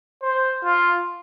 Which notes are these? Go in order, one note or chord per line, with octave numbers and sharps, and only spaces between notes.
C5
F4